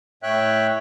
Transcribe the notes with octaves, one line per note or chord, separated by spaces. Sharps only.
A2 C#5 E5 G5 F#6